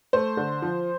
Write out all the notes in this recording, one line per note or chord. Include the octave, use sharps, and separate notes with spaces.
A3 C5
D3
F3